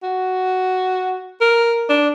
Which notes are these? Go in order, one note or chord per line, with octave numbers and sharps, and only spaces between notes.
F#4
A#4
D4